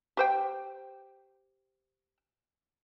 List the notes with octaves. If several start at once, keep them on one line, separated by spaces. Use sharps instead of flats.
G4 C5 G5